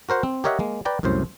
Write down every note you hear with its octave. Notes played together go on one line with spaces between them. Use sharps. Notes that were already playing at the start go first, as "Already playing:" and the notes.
F#4 A#4 C5 F#5
C4
G4 A#4 C#5 D#5 E5 F#5
G#3 A#3
B4 D5 G5 A#5
C2 F#2 A2 C5